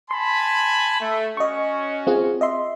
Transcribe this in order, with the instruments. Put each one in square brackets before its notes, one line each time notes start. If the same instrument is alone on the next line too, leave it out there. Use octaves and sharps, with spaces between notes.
[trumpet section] G#5 A5 B5 [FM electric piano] C6
[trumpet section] A3
[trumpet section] C#4 F#4 [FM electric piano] D#5 C#6
[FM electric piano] C4 F4 G#4
D#5 E5 C6